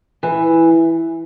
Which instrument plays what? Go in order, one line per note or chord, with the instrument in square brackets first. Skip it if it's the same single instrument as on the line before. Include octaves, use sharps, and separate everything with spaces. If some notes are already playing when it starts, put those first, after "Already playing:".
[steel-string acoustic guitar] E3